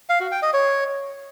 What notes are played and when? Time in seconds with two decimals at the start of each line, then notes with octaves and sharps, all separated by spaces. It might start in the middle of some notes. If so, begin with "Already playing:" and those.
0.09 F5
0.20 F#4
0.31 G5
0.42 D#5
0.53 C#5